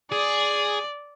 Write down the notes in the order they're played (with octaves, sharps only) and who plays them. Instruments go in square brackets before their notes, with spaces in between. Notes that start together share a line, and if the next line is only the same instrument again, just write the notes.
[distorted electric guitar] G#4 [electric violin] D5